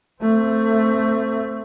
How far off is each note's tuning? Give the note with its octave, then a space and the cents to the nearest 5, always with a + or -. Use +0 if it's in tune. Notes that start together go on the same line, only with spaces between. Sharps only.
A3 +20 C4 +0